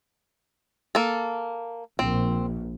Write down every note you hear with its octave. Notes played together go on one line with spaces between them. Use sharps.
A#3 A4
A#1 C4